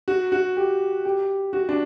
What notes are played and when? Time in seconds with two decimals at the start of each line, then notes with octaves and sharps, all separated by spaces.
0.08 F#4
0.32 F#4
0.57 G4
1.05 G4
1.53 F#4
1.69 D4